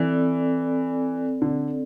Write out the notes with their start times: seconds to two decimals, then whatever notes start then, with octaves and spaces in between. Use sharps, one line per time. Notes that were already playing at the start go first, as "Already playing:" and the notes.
Already playing: E3 C4 A4 D5
1.42 D3